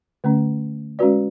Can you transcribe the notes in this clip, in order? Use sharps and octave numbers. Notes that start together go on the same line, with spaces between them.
D3 A3 C#4
G#3 C#4 F#4 B4 D5